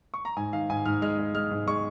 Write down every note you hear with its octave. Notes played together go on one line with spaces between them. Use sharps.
C#6
A#5
G#2 G#5
D#3 F5
G#2 G#5
G#2 F6
G#3 F6
G#3
G#3 F6
G#2
G#3 C#6